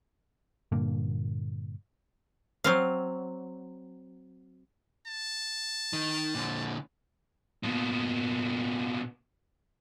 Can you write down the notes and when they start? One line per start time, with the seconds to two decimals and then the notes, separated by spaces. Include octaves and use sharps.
0.72 G2 A#2 D3 A#3
2.64 F#3 C4 F5
5.07 A5
5.93 D#3
6.35 A#2 D3
7.64 B2 A#3